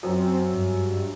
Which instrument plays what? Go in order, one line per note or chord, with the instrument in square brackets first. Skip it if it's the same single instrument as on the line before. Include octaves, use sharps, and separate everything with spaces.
[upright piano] F#2 [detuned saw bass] C4
[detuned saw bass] G2